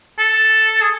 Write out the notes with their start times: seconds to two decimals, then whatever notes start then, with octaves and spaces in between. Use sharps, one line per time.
0.19 A4
0.81 G#4